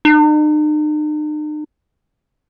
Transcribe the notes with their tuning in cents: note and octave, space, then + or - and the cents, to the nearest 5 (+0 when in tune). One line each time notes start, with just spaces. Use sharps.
D#4 -45